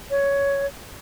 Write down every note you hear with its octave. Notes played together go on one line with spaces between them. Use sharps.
C#5